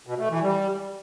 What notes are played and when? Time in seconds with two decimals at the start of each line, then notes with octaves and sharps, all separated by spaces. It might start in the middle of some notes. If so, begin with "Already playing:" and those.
0.07 B2
0.18 A3
0.30 E3
0.42 G3